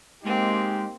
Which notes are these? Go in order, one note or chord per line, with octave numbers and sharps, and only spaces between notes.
G#3 A#3 C4 D#4 G4